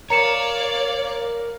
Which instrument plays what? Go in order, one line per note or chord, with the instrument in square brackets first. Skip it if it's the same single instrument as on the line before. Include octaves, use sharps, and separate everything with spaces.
[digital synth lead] A#4 [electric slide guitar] C#5 [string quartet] D5 F5 [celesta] A#5 C#7 E7